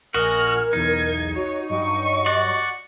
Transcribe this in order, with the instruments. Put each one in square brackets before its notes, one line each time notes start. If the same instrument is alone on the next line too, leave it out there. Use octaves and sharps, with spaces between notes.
[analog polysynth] A#1 G#5 [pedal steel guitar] F#4 D#5 [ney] A#4 [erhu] F6
[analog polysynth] B1 E2 [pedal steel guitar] D#4 [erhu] G#6
[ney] F#4 [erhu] C#5
[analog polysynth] G2 F#3 [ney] D#5 [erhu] C#6
[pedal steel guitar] F#4 D5